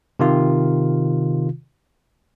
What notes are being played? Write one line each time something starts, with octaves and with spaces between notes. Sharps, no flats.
C3 D#3 F4